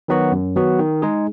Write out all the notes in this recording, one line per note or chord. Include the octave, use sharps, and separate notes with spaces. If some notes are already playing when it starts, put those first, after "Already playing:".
D#3 F#3 B3 F#4
F#2
D#3 F#3 B3 F#4
D#3
G#3 D#4 G#4